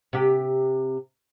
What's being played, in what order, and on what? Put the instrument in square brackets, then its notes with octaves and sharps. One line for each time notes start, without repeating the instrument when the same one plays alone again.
[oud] C3 G4